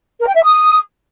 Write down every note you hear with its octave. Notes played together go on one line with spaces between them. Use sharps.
A#4
G5
E5
D#6